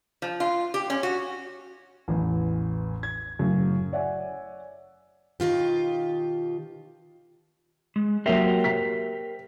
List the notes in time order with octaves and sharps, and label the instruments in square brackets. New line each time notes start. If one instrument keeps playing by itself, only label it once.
[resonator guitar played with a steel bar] F3
F4
G4
C#4
F#4
[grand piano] A1 E2
G#6
F#1 F#2 A2 C#3
C#5 D5 E5 F#5 G#5
[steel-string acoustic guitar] B2 D#3 F4 G4
[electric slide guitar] G#3
[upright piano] F#3 A#3 E5 [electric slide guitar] G4 A#4 C5
[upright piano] B6